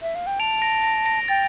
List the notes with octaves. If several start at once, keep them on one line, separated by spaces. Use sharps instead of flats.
E5
F5
G5
A5 D7 F7
A#6 D7
A#6 D7
A#6 D7
G5 A6